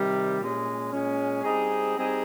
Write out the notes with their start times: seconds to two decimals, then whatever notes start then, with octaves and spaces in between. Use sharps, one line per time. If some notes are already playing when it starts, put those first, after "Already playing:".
Already playing: C3 D#3 G3
0.39 A#2 G#3 C#4
0.91 A#2 G#3 C#4
1.43 G3 C4 D#4 G#4
1.96 G3 C4 D#4 G#4